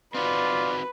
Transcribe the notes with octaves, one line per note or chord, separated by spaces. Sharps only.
C4 D#4 F4 F#4 B4 D5